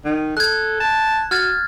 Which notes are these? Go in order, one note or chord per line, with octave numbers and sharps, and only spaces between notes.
D#3
A4 F#6 G#6
A5
F#4 F6 G#6 A6